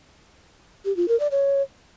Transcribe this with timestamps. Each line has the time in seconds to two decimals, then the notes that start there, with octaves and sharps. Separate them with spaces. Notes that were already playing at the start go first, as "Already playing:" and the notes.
0.85 G4
0.97 F4
1.08 A#4
1.20 D5
1.31 C#5